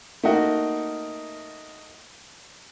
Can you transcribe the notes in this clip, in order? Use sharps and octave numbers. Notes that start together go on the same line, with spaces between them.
A3 A#3 D#4 F#4